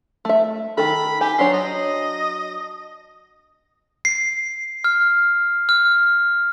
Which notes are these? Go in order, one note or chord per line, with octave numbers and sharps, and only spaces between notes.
A3 E5
D#3 A4 B5
G4 G#5
F#3 D4 C#5 C6
D#5
C7
F6
F6